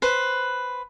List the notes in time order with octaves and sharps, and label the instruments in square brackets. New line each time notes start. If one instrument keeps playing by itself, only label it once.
[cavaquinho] B4 C5